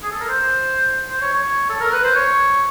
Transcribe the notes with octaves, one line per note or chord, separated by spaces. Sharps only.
G#4
A4
A#4
C5
C5
C#5
C#5
A4
A#4
B4
C5
C#5